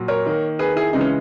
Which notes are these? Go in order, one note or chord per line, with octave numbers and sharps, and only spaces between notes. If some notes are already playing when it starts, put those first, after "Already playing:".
Already playing: A#2 F#3
A#4 C#5
D#3 A#3
G#4 B4
E4 G#4
C#3 E3 G#3 D#4
C#4